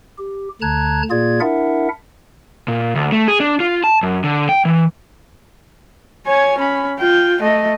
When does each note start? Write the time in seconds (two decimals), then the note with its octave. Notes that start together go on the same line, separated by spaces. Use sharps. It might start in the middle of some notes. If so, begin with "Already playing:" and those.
0.18 G4
0.62 D2 D3 A5 A#5 F#6 G#6
1.10 A#2 A#3 F4 G#4 D5 G#6
1.40 D4 E4 A#4 E5 F#5
2.68 A#2
2.95 D2
3.12 A3
3.28 G#4
3.40 D4
3.60 F4
3.84 A5
4.03 F#2
4.24 D3
4.49 G5
4.65 E3
6.27 C#5 G#5
6.59 C#4 B5
7.00 F4 G5
7.42 A3 D#5